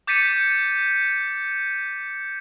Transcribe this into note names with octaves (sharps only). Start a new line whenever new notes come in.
D6 G6 A6 B6 C#7 D#7